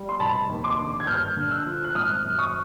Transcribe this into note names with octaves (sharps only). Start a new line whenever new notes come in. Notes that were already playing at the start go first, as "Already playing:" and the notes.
Already playing: G3
C6
F1 A5 B5
D#2
C6 D6
D3
G#6
G2 F6 G6
D3
E6 F#6
F3
F#6
G#1 D#6 F6
F#2
C#6 D#6